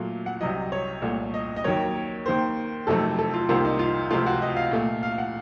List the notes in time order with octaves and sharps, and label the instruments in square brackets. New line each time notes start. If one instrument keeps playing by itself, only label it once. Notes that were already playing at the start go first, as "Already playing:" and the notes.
Already playing: [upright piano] A#2 F#3 A3 F5
F#5
C2 C3 F#3 D#5
C#5
C2 A#2 A3
D#5
D#5
D#2 D#3 F#3 A#3 C#5
D#2 D#3 A#3 C5
F2 C3 D#3 F#3 A3 A4
A4
F4
C2 C3 D#3 A#3 F4
D#4
F4
C#2 C3 F3 A3 F4
F#4
D#5
F5
A#2 A3
F5
F#5